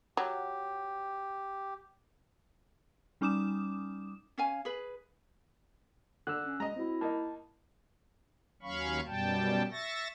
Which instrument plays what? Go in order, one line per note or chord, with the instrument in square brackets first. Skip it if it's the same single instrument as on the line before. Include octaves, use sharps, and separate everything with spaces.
[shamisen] F#3 [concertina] G4
[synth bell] G3 C#4 D#4 D6 D#6 E7
[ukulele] C#4 F5 G#5
G#4 B4
[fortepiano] D3 [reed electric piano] E6 F#6
[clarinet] C#4
[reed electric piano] G#3 [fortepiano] D#5 A#5
[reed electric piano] C4 F#4 [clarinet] E4
[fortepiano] A#3 D#4 [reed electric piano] A5
[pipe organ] D#2 F#3 C#4 F5 B5 C#6
F#2 B2 G3 G5 A5
E5 C#6 A6 A#6